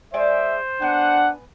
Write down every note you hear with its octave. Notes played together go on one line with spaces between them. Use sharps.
G#3 C5 D5 E5 G#5
B3 D4 F#5 G#5